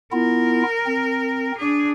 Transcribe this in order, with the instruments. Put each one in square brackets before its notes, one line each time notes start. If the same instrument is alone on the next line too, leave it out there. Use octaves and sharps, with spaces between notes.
[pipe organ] B3 E4 F4 [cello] A#4
[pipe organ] C4
[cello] D4 G#4